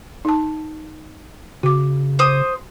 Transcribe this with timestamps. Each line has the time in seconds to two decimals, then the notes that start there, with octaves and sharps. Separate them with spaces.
0.25 D#4 A5
1.63 C#3 F#4 D6
2.19 C5 D#6